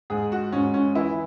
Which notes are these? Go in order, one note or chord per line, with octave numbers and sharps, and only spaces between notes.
G#2 G#4
F#4
G#2 C#4
C#4
E3 E4